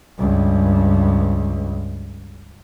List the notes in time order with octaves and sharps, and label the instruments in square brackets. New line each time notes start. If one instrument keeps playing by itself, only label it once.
[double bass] C#2 G2